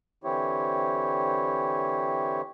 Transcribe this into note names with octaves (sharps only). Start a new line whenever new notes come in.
D3 E3 C4 E4 G4 C#5